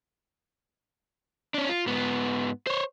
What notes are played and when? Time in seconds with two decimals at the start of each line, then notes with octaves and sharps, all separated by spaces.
1.54 C#4 D4
1.69 F4
1.86 G#2 B3
2.67 C5 C#5